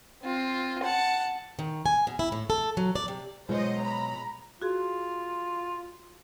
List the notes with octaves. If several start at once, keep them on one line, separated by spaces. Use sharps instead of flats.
C4 F4
F#5 A5
D#3
G#5
B2
E4
A2
A4
F#3
D5
C3
B2 F#3 G#3 F4 C5 C#5 D#5
A#5 B5
F4 F#4 G#4